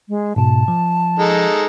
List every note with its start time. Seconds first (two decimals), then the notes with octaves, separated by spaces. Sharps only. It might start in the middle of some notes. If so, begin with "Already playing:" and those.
0.09 G#3
0.36 G#2 B2 A5
0.68 F3
1.19 G#3 D#4 A4